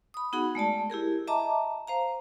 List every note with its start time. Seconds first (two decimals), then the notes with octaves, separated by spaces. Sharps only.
0.14 B5 D#6
0.33 B3 D#4 F#4 G#4 F#5 B5
0.55 G#3 A3 D5 A5
0.90 E4 G4 G#4 A#4
1.27 D#5 E5 A5 A#5 D6
1.87 C5 F5 A#5